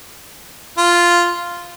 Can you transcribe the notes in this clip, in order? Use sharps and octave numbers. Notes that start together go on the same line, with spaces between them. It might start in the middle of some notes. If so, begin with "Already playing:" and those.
F4